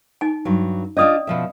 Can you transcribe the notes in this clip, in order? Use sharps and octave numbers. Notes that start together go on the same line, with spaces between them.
D#4 G#5
G2 F#3
C#4 D4 F4 D5 D#5 D#6
B2 F3 E5